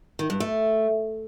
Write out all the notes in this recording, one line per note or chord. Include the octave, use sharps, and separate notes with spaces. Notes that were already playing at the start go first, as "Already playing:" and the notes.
D#3
G2
A3